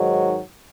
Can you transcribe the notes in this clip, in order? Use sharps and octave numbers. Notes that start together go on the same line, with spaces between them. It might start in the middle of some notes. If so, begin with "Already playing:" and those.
Already playing: G#2 D#3 F#3